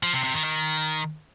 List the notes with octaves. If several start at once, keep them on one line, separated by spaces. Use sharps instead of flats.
F3
C3
C3
D#3
D#3